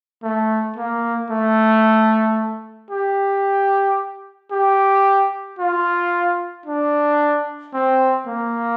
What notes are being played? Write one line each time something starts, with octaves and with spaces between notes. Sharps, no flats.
A3
A#3
A3
G4
G4
F4
D4
C4
A#3